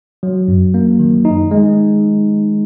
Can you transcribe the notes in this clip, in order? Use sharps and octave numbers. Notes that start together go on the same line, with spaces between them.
F#3
F#2
A#3
D#3
D#4
G#3